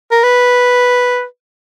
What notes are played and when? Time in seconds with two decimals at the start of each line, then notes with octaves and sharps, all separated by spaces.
0.11 A#4
0.23 B4